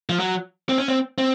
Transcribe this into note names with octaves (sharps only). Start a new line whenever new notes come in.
F3
F#3
C4
C#4
C4
C4